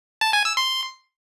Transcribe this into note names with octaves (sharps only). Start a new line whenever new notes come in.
A5
G#5
E6
C6